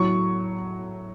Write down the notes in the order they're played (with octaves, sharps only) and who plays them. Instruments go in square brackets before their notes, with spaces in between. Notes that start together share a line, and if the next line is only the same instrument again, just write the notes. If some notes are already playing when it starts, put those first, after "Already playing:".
Already playing: [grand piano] A2 F#3 C#6